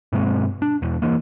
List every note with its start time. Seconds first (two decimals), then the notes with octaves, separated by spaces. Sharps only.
0.13 G2 B2 G#3 C4
0.62 D4
0.82 E2 B2
1.02 E3 A#3